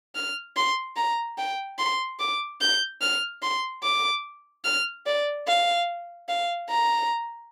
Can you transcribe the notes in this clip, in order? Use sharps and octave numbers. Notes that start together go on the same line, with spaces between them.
F6
C6
A#5
G5
C6
D6
G6
F6
C6
D6
F6
D5
F5
F5
A#5